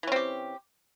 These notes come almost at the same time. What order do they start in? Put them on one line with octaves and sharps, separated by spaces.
E3 C#4 C4 G4